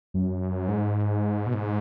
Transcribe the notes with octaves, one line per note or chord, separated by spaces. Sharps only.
F#2
G#2
B2
G#2